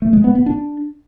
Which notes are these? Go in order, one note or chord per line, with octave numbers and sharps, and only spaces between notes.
A3
G#3
B3
B3
D4